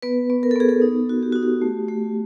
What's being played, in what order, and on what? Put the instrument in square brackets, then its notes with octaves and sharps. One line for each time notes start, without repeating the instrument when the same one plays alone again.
[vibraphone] B3 B4
B3
A#4
A4
B3 G#4
A4
D#4
F#4
G4
D#4 F#4
G4
A3
A3